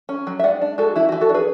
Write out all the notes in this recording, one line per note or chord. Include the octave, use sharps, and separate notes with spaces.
C#4
F#3
E5
G#3 D5 F#5
D4
G#3 F#4 A4
E3 E4
F#4
E3
F#4 A4
D4
G#4 B4